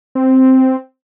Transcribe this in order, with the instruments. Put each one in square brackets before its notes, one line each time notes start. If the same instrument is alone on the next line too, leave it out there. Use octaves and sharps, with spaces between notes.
[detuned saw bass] C4